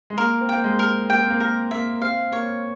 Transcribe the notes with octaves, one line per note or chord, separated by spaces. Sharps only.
G#3
A#3 A#4
C4
A#3 G5
G#3
A#4
A#3 G5
C4
A#3
A#3 A#4
A#3 E5
C4 F5
A#3 C#5